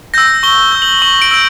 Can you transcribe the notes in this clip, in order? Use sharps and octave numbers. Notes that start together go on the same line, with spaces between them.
E6 G6 A#6
C#6 G7
E6 G6
F#7
C#6 F#7
D7
E6 G6